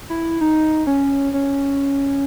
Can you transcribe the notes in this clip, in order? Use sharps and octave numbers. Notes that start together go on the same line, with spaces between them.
E4
D#4
C#4
C#4